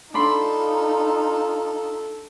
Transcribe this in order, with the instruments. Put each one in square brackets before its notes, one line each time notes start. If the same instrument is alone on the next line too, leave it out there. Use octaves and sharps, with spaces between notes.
[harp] D4 B5 C6 [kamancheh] D#4 F4 [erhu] A4